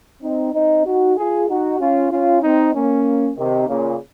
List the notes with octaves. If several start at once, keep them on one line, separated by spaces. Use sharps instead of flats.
C4 D#4
C4 D#4
D#4 F#4
F4 G#4
D#4 F#4
C#4 F4
C#4 F4
C4 D#4
A#3 C#4
C3 D#3
A#2 C#3